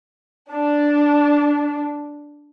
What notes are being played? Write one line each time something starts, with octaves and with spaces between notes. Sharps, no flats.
D4